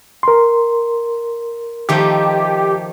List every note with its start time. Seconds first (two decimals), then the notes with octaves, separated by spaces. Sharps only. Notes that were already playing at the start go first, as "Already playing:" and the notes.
0.23 A#4 C6
1.89 D#3 F3 A3 G4